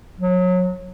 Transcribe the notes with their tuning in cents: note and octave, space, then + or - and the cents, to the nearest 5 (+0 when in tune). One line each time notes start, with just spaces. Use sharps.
F#3 -25